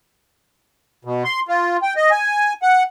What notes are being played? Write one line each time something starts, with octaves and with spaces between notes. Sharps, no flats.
B2
C6
F4
G5
D#5
G#5
F#5